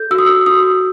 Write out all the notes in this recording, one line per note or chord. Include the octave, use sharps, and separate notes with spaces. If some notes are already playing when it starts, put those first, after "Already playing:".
Already playing: A4 G6
F#4 E6
D#6
E6
F#4 D#6